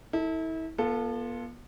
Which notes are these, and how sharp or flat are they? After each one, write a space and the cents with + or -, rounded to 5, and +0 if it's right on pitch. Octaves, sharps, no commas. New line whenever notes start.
E4 -35 A4 +20
B3 -40 F4 +0 A4 +0